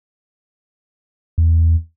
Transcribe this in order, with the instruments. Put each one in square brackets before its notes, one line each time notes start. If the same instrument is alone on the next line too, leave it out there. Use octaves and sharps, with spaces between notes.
[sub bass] E2